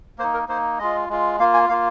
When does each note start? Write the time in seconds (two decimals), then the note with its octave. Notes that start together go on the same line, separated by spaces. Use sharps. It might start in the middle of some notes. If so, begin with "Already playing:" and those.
0.18 A#3 C5
0.23 D#4
0.34 A#4
0.48 A#3 D#4 C5
0.79 G#3 F4 D#5
1.09 G#3 F4
1.39 A#3 F4 F5
1.54 G#5
1.69 A#3 F4 F5